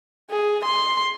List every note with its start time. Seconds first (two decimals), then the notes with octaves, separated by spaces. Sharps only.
0.31 G#4
0.65 C6